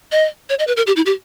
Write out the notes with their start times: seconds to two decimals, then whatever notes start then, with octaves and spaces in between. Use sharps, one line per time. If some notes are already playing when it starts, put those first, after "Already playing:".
0.12 D#5
0.50 C#5
0.59 D#5
0.67 B4
0.77 A#4
0.87 G4
0.96 E4
1.06 G4